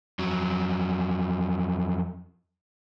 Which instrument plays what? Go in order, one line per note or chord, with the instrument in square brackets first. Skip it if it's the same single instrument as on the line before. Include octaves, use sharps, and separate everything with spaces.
[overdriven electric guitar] F2 F#3